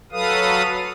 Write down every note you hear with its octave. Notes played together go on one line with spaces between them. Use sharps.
F#3 A4 B4 F5 D#6